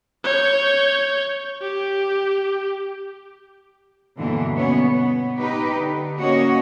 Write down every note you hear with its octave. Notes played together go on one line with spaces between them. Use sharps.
C#5 G6
G4
G2 B2 D3 E3 F#3 A#3
B2 B3 C#4 C#5
B3
D#4 G4 B4
D3
A#3 C#4 F#4 C#5 D#5